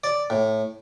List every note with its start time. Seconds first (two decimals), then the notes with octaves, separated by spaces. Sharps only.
0.04 D5
0.30 A2